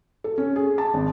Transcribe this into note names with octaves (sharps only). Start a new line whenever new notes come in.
A4
C#4
G#4
A5
G#1